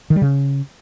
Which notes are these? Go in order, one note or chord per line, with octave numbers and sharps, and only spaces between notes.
D#3
G3
C#3